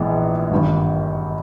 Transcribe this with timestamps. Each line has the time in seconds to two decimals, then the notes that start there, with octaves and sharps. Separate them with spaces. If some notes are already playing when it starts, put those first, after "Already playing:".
Already playing: A#1 G#2 E3 G#3 B3
0.51 G#1 G2 D#3